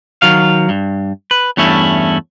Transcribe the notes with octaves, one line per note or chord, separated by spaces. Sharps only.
D#3 F#3 F5
G2
B4
E2 G2 A3 C#4 E4